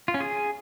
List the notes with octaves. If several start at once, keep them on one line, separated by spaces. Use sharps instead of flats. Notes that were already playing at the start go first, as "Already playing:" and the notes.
F4
C#4
G#4